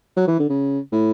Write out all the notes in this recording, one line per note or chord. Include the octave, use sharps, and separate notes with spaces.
F#3
E3
D3
C#3
A2